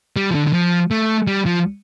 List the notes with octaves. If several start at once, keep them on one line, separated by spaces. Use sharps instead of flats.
G3
F3
D3
D3
F3
A3
G3
F3